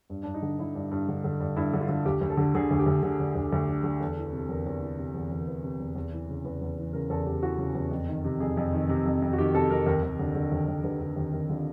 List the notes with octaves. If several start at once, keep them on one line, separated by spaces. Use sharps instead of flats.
G2
G2 D4
D#4
D3
D3 E4
G2
G2
D3
D3
G2
G2 E4
D3
F4
D3
D2 G4
D2
A4
D3
D3 G#4
D2
G4
D2
D3 G#4
D3
D2
D2
D3
D3
E2 A4
E3
C3 A4
E2 A#4
E2
E3
C3
E2
E2
A#4
E3 B4
C3
E2
E2
E3
C#3
E2 B4
E2
E3
C#3 A#4
E2 A4
E2 G4
E3 F#4
C#3
E2
F2
D#3
C3
F2 G#4
F2
D#3
C3
F2
F2
F#4
D#3 G4
C3 A4
F2 A#4
D#2 A#4
D#2
D3
D3
D#2
D#2
D3 B4
D3
D#2
D#2 A#4
D3 F4